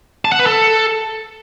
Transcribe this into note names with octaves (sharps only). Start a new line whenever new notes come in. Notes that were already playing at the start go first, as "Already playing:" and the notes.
A5
F#5
B4
A4